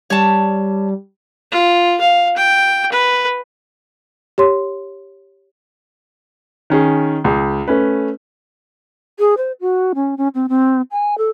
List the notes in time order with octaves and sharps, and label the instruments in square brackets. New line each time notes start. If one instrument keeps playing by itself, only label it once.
[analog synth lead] G3 [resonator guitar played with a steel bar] C#5 A5
[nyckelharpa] F4
F5
G5
B4
[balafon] G4 C#5 C6
[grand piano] D#3 C#4 G#4
C#2 G#4
A3 C#4 B4
[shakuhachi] G#4
C5
F#4
C#4
C#4
C4
C4
G#5
A4